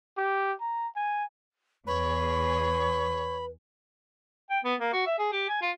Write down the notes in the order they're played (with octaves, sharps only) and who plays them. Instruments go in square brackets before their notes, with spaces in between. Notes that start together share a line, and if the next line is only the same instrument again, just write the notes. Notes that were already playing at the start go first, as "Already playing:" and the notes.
[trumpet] G4
A#5
G#5
[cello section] E2 G#4 [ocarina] B4 [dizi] C#5 [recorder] B5
[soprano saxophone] G5
B3
A#3
F#4
E5
G#4
G4
G#5
F4